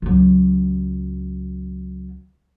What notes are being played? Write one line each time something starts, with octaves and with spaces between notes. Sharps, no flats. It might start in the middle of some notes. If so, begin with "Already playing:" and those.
C#2 F#3